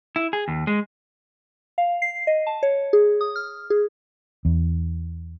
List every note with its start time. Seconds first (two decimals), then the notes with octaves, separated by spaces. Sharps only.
0.16 E4
0.33 G#4
0.48 D#2
0.67 G#3
1.78 F5
2.02 C7
2.27 D#5
2.47 A5
2.63 C#5
2.93 G#4
3.21 D#6
3.36 F6
3.70 G#4
4.45 E2